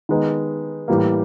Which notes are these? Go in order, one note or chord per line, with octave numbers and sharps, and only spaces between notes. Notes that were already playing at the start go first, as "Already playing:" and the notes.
D#3 G#3 B3 D#4
A2 E3 G3 A#3